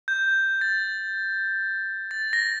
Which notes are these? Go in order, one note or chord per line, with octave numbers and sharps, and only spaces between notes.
G6
A6
A6
A#6